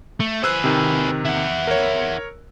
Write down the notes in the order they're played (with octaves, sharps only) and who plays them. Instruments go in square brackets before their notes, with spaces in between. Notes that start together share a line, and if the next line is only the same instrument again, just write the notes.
[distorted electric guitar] A3
[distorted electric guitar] G#4 B4 [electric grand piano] C5 E6 F#6
[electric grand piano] C3 D#3
[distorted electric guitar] E4 F#5
[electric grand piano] A#4 C#5